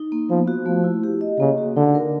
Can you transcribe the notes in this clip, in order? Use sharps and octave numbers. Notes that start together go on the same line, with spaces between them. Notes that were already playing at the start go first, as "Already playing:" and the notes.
Already playing: D#4
A#3
F3 B3
F#4
F3 A3
E4
G4
D#5
C#3 A#3
F#4
D3 D#4
A#4